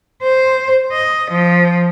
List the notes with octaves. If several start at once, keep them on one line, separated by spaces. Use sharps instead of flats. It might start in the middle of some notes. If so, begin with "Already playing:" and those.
C5
D#5
F3